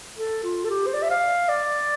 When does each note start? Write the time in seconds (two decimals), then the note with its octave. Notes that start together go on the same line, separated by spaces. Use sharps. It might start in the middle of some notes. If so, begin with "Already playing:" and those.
0.18 A4
0.44 F4
0.65 A4
0.70 G4
0.87 C5
0.94 D5
1.02 E5
1.10 F5
1.49 D5